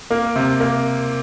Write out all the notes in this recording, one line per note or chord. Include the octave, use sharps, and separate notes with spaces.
A#3
C3
A#3